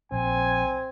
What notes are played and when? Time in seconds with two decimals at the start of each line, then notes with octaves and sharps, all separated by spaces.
0.12 A#1 C4 G#5